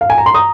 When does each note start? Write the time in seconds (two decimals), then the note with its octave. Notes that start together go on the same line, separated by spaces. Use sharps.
0.01 F5
0.10 G#5
0.18 A#5
0.26 C6
0.34 A#5 D#6